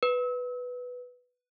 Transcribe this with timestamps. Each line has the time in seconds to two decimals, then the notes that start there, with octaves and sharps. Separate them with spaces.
0.03 B4